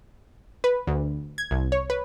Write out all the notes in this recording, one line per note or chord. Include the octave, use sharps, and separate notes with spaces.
B4
D2
G#6
C2
C#5
B4